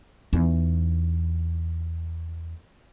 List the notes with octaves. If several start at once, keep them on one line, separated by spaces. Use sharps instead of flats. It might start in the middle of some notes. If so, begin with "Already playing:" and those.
E2 D#4